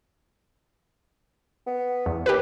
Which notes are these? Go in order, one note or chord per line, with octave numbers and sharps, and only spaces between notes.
B3
E2
D#2 G4 B4